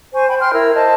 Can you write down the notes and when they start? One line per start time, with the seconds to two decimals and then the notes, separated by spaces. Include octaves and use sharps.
0.14 C5 G#5 C#6
0.28 G5 B5
0.39 G5 C6 F6
0.52 E4 A#4 E6
0.75 C5 D#5 A5